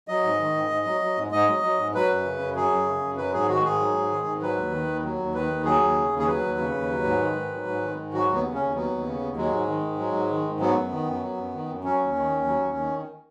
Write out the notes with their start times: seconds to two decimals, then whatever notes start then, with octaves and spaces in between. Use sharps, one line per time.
0.08 F#3 D#5
0.23 G#2
0.40 D#3
0.54 G#2
0.70 G#2
0.85 F#3
1.01 F#3
1.17 G#2
1.32 G#2 D#5
1.47 F#3
1.63 F#3
1.78 G#2
1.94 F#3 B4
2.10 F#2
2.25 C#3
2.40 F#2
2.56 F#3 G#4
2.71 F#2
2.86 C#3
3.02 F#2
3.17 F#3 B4
3.33 G#2 G#4
3.48 D#3 F#4
3.64 G#2 G#4
3.80 F#3
3.95 G#2
4.11 D#3
4.27 G#2
4.41 F#3 B4
4.57 D#2
4.72 D#3
4.87 D#2
5.03 F#3
5.19 D#2
5.34 D#3 B4
5.50 D#2
5.65 F#3 G#4
5.81 D#2
5.97 C#3
6.11 D#2
6.19 G#4
6.27 F#3 B4
6.42 D#2
6.58 C#3
6.74 D#2
6.90 F#3
7.04 G#2
7.20 D#3
7.36 G#2
7.52 F#3
7.67 G#2
7.82 D#3
7.97 G#2
8.13 F#3 F#4
8.28 D#2
8.34 B3
8.44 C#3
8.54 D#2 C#4
8.75 F#3 B3
8.90 D#2
9.06 C#3
9.21 D#2
9.36 F#3 G#3
9.51 G#2
9.68 D#3
9.83 G#2
9.99 F#3
10.13 G#2
10.30 D#3
10.44 G#2
10.60 F#3 B3
10.76 F#2
10.91 D#3
11.07 F#2
11.22 F#3
11.37 F#2
11.54 D#3
11.69 F#2
11.84 F#3 C#4
11.99 D#2
12.15 D#3
12.31 D#2
12.46 F#3
12.61 D#2
12.76 D#3